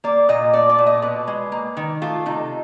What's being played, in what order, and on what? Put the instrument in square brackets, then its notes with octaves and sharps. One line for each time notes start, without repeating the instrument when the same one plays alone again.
[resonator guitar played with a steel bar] A#3 D5
A#2 D#5
A3 D5
D5
A#2
D#5
B2 B4
G#3
A#3
D#3
A3 F4
C3 D#4